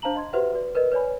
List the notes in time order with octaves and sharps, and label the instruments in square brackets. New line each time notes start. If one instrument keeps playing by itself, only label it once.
[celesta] D4 C5 F5 A5 A#5 F#7
D#5 C6 G#6
F#4 G4 B4 C5 E5 F#5
F#4 B4 D5
A#4 B4 D5 D#5
B4 C#5 D5 G#5 B5